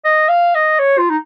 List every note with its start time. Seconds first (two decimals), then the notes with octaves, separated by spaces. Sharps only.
0.05 D#5
0.29 F5
0.55 D#5
0.79 C#5
0.98 F4
1.10 D#4